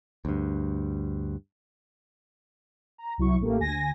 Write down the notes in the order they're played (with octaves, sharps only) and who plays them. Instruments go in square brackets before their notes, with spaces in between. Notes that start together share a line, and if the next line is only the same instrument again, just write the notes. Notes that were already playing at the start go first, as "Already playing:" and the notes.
[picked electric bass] D2 G2
[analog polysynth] A#5
C2 F#3 E4 C#6
A1 A3 A#3 G4
D2 G#5 A#6